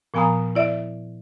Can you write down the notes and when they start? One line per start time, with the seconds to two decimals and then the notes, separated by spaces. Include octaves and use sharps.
0.14 A#2 F3 B3 G#5 A#5 D#6
0.55 E4 D5 E5